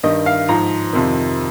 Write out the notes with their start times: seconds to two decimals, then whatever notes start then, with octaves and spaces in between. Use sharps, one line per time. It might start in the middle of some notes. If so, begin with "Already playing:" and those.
0.03 G2 D#3 D#5
0.26 F5
0.48 G#2 F3 A#5
0.93 F2 C3 D#3